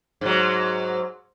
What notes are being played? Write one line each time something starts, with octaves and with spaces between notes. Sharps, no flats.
G#2 F#3